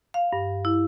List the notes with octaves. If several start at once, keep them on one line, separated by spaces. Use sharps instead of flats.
F5
G2
E4